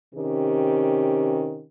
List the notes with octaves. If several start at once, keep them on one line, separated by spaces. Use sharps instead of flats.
C3 D#3 C#4 G4